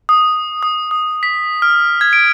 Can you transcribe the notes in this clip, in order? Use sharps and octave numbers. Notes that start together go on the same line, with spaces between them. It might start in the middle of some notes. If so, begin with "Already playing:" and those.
D#6
D#6
D#6
B6
F6
G#6
D7